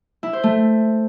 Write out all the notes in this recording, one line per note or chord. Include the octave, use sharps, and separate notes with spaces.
E4
C5
A3